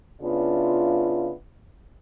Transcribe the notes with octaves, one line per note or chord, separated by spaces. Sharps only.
C#3 B3 D4 E4 F4